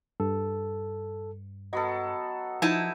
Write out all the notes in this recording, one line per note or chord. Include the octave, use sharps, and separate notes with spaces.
G2 A4
F#3 B3 A4 D#5
F3 D#4 E4 A5